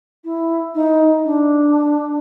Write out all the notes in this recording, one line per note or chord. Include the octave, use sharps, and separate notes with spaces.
E4
D#4
D4